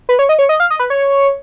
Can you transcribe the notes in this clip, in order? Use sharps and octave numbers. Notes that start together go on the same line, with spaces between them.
B4
C#5
D#5
C#5
D#5
F5
D#5
B4
C#5